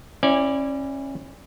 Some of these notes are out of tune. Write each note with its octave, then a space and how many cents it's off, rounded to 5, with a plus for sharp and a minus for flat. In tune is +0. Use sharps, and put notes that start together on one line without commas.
C#4 -30 E4 +0 D5 +0